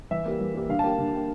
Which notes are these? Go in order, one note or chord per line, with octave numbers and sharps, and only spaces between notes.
E3 E5
G3 A#3
E3
G3 A#3
D3 F5
A5
G3 A#3 G5
D3
G3 A#3